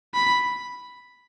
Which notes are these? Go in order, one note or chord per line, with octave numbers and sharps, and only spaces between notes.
B5